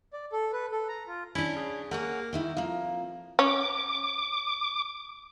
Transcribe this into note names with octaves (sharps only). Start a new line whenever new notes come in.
D5
A4
B4
A4
A#5
F4
C#4 D4 E4
C#3
A#3 G#4 C#5 F#5
D#3 D#4 E4
F2 F3 A#3
C#4 D6